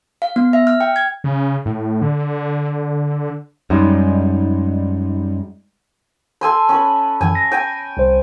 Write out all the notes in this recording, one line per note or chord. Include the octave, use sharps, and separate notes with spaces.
F5
B3
E5
F6
G5
G#6
C#3
A2
D3
F#2 G3 G#3 D#4
A4 G#5 C6
C#4 B4
F#2 E3 G#5
A#6
G5 G#5
C2 C5